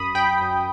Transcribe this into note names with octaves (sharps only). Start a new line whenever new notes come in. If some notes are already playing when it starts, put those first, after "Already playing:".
Already playing: F#2 B5 D#6
F#2 G5 B5
F#2